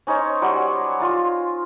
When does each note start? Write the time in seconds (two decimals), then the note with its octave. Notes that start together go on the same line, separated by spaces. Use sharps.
0.07 C#4 D#4 C5 C#5
0.42 F#3 G3 F#5
1.00 F4 A#5